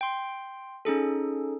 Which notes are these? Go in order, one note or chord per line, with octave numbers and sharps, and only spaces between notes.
G5 C6
C#4 D#4 G#4 A4